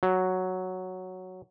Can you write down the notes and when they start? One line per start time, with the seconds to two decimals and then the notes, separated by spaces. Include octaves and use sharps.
0.03 F#3